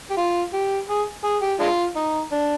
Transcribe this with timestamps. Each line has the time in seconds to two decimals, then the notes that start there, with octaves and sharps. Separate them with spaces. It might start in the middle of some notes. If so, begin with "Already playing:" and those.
0.10 G4
0.17 F4
0.53 G4
0.89 G#4
1.24 G#4
1.42 G4
1.60 G#3 D4 F4
1.96 D#4
2.32 D4